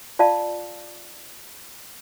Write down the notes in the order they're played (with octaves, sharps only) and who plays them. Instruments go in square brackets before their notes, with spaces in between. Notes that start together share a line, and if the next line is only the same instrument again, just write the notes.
[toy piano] F4 D5 F5 A5